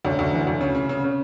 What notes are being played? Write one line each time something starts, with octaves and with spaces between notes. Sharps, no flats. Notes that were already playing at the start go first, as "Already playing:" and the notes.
D2 C#4
D2
E3
D2
C#3
C#3
C#3
C#3